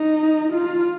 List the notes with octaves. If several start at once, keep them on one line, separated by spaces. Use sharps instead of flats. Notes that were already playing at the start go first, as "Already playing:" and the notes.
Already playing: D#4
F4